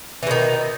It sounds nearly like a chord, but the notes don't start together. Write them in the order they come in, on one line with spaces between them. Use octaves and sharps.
E3 B2 D#3